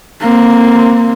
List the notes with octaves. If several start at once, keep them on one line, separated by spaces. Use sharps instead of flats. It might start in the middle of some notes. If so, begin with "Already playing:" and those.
A#3 C4